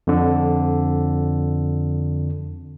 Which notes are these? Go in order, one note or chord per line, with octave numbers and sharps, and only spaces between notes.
F2 D3